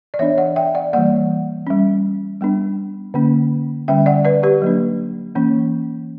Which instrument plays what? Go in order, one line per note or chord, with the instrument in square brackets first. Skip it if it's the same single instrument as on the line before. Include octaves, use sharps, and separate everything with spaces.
[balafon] D5
E3 B3 D4 C#5 E5
D5 F#5
E5 G5
D5 F#5
E3 G3 A#3 D5 F#5
G3 C#4
G3 B3 D4
D3 A#3 C#4
D3 G3 C#4 E5 G5
D5 F#5
B4 D5
G4 B4
F#3 A#3 D4
E3 A#3 C#4